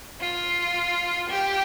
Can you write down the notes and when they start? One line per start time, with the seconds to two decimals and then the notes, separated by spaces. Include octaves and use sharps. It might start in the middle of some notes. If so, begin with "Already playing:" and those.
0.21 F4
1.30 G4